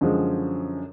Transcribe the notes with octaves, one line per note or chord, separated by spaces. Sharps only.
F#2 D3 F3 G#3